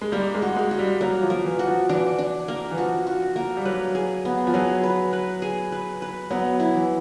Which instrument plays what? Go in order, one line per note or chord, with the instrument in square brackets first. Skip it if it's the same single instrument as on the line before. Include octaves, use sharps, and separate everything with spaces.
[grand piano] G#3
[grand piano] G3 [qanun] A#3
[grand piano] G#3
[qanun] F#4
[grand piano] G#3
[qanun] F#4
[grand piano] G3
[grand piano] F#3 [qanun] A#3
[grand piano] F3
[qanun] A#3
[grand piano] E3
[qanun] F#4
[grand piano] F3
[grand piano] E3 [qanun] D4
[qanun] D4
A#3
[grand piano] E3
[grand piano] F3 [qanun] F#4
[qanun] F#4
A#3
[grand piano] G3
[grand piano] F#3 [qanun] B4
[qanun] G#4
B3
[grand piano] F3
[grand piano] F#3 [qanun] G#4
[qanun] B4
B4
G#4
B4
B4
[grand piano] F#3 [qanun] B3
[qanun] E4
[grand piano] E3